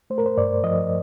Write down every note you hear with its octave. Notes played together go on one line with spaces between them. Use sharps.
A3 C5
A#4
C5
G2 D5
F3 D#5